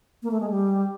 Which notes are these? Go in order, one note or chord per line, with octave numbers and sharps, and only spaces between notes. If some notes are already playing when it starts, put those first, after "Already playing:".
A#3
A3
G#3
G3